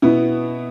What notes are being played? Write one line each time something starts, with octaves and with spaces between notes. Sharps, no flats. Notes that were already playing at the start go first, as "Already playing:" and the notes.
B2 B3 E4